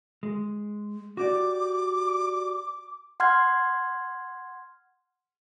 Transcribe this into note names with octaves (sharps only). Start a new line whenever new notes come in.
G#3
F#4 G4 D5 D6
F#5 C6 F6 G#6